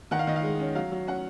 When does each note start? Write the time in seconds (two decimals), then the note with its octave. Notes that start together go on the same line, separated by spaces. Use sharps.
0.11 D#3 F#5
0.19 F5
0.27 D#3 D#5
0.36 F5
0.43 G#3
0.59 C#4
0.75 F#3 F5
0.92 F#3
1.07 C#4 F#5